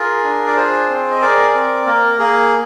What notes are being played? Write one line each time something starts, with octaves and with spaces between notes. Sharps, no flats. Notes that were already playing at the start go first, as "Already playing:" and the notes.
Already playing: F4 G#4 A#4
D4
D5
F4 G#4 C5
C4
D#5
G#4 A#4 D5
C4
A#3 A#4
A#3 G#4